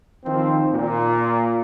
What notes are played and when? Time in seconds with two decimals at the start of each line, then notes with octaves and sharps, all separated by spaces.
0.24 D#3 F3 C4
0.73 A#2